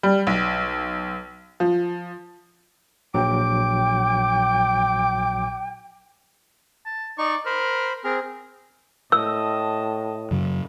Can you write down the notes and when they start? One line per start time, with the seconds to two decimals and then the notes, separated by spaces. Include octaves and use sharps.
0.03 G3
0.27 B1
1.60 F3
3.14 A#1 F#3 G5 D6
6.86 A5
7.18 D#4 D5 C#6
7.46 A#4 C5 B5
8.04 C4 G#4 A#4
9.12 A2 D#5 A5 E6
10.31 F#2 C#3 F#3